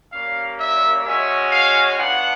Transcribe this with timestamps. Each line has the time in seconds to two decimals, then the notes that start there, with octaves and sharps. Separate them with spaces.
0.13 G3 A#3 C#4 F5
0.59 E5
1.06 G#3 C#4 F#4 E5
1.52 F5
1.98 B3 D4 F4 F#5